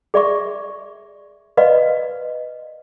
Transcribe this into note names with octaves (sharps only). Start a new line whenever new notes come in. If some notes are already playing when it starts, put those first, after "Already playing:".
G#4 D5 E5 C#6
B4 D5 D#5 F5